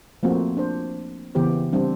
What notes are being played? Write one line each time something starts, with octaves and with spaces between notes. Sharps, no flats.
F3 A3 A#3 C4 F#4
D4 C5
C#3 E3 B3 G4 C5
G3 C4 D4